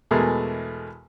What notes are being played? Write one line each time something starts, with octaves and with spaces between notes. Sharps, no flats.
E2 B2 G#3 A3 G#4 A#4